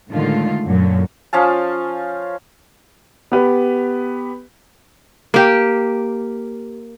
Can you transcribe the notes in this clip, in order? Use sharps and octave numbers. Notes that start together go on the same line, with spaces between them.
A2 D3 D#3 G#3 A3 F4
F#2 A#2 D3 F#3
F3 C#4 F5 A5
B3 G4 B4
A#3 G4